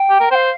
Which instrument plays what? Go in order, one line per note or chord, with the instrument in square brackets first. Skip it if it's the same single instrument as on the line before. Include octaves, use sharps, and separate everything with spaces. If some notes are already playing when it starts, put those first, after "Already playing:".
Already playing: [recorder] G5
[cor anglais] G4
A#4
[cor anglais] C5 [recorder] G5
[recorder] F5